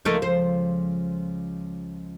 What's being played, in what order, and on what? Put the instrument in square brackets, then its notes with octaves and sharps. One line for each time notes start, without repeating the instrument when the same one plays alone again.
[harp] C#2 F3 [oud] A3 A#3 D#4
[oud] C5